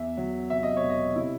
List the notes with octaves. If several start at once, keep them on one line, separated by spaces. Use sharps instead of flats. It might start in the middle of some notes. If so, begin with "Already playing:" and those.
Already playing: E2 E5
F#3
C3 E5
D#5
C#5
E1
D#5
C3 E4